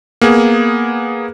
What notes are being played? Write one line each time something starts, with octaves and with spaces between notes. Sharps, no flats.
A#3 B3 G#4